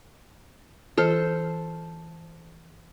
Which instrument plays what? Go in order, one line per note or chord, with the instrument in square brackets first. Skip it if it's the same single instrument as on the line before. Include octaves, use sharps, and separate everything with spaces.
[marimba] E3 F4 [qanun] A4 C5